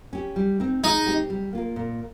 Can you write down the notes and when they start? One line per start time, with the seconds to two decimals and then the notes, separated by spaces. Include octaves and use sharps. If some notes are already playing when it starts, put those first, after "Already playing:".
0.13 C#4 G4
0.36 G3
0.60 C4 D#4
0.83 G#3 D#4
1.06 C4 G4
1.30 G3
1.53 A#3 F4 A#4
1.76 A#2